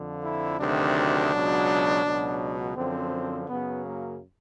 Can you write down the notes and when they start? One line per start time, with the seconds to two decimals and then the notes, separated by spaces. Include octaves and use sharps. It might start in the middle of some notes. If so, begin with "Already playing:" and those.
Already playing: F2 D3 F3
0.24 E4
0.59 D2 C3 D#3 F#3 D4
1.32 C#2 B2 F#3
2.05 C#2 B2 F#3
2.76 F#2 D3 F3 C4
3.49 F#2 C#3 F#3 B3
3.85 A#3